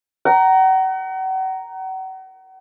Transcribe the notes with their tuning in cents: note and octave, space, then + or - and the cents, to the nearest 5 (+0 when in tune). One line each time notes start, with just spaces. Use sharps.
F#5 +40 A#5 +0